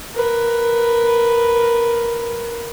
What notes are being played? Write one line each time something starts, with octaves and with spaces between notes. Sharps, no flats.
A#4 B4